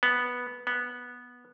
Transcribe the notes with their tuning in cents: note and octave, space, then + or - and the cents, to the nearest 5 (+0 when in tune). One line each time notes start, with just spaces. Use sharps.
B3 -5
B3 -10